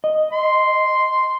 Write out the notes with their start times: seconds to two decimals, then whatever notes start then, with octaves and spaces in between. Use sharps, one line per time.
0.04 D#5
0.33 C6